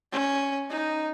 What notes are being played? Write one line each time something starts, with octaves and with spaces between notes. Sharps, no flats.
C#4
D#4